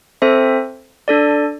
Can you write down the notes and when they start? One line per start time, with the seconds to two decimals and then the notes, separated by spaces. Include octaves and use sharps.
0.22 C4 A4 C5 E5
1.08 D4 A4 D5